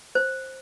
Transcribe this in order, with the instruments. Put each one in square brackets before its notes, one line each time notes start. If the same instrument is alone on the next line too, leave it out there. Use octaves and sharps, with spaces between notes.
[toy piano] C5